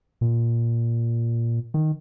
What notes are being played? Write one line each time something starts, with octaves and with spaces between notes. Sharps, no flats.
A#2
D#3